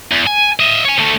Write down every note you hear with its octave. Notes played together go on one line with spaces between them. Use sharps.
E2
G#5
D#5 E5
C#5 G#5
D2 A3